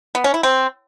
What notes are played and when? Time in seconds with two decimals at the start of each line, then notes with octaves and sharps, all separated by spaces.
0.15 B3
0.24 C#4
0.34 E4
0.43 C4